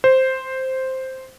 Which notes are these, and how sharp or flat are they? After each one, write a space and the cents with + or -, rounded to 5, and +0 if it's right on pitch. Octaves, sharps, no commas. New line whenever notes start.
C5 +0